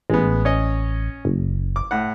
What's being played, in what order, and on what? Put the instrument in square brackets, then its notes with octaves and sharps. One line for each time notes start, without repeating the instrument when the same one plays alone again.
[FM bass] A1 [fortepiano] G#3 B3
[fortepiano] C#4 C#5 D#5
[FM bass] F#1
[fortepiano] D6
A2 F#5